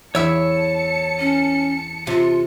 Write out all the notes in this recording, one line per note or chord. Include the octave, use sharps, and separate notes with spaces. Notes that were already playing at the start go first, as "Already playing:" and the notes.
E2 E4 C#5 E5 A5 E6 C#7
C#4
C3 F4